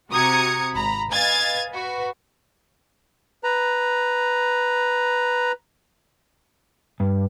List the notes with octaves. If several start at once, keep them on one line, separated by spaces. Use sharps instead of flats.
C3 F#4 A#5 D#6 G#6 C#7
G#1 A#5 B5
B4 D#5 F5 G#5 G#6 A6
F#4 B4
B4 A#5
G2